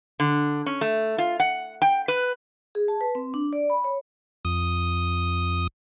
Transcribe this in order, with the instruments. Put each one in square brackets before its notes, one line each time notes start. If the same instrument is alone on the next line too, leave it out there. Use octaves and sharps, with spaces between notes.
[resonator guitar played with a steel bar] D3
C#4
A3
F4
F#5
G5
B4
[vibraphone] G#4
A5
B4
C4
D4
D5
B5
C#5
[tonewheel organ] F2 D#6